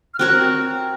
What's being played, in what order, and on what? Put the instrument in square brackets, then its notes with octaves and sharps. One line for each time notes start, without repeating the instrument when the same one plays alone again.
[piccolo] F6
[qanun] C4 F#4 A#4 C#5 [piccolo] F#6